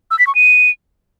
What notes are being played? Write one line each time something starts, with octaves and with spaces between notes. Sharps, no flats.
E6
B6
C#6
D#7